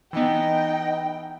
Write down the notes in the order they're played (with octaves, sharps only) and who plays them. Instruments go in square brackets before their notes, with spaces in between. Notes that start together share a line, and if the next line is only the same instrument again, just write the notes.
[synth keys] E3 B3 [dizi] D#4 [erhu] G5